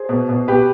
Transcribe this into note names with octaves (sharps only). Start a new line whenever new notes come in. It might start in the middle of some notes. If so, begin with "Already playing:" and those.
Already playing: G#4 C5
B2
B2
B2 G4 B4